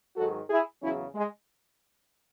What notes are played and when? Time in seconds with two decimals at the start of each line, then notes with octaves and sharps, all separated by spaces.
0.16 G#2 D#3 F#3 F#4 A4
0.49 E4 G#4
0.81 E2 C#3 F#3 C#4 E4
1.14 G#3